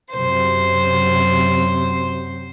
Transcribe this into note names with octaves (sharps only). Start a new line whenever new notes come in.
F#2 C3 F#3 C5